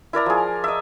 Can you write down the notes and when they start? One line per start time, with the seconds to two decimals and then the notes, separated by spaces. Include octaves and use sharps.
0.13 E4 A#4 D5 A#5
0.26 F3 G#4
0.64 D#5 E5